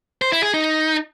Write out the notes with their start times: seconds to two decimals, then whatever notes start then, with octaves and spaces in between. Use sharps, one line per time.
0.22 C5
0.32 E4
0.43 G#4
0.54 D#4